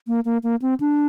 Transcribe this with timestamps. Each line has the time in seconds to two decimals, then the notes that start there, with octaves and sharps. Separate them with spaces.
0.08 A#3
0.25 A#3
0.43 A#3
0.62 C4
0.80 D4